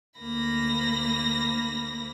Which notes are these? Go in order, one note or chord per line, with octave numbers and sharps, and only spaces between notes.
D2 A#3 B5 A#6